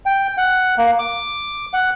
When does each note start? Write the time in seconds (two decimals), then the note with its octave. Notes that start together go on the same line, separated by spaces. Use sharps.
0.06 G5
0.38 F#5
0.78 A#3
0.99 D6
1.73 F#5